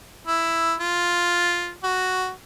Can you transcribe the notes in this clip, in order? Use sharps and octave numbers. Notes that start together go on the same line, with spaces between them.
E4
F4
F#4